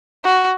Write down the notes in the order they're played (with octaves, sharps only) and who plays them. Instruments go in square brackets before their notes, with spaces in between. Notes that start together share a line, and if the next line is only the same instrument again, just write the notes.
[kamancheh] F#4